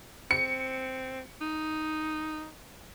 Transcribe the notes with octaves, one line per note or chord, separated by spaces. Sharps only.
C4 C#7
D#4